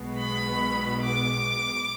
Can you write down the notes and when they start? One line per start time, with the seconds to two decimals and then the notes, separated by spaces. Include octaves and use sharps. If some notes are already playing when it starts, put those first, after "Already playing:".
Already playing: B1 B2 G#3 B3
0.18 B5
1.03 D6